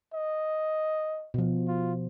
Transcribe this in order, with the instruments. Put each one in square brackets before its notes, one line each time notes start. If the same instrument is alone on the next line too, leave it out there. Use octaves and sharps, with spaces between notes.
[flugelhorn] D#5
[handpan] B2 F3
[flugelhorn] F4